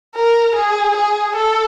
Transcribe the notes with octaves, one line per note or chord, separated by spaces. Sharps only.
A#4
G#4
G#4
A4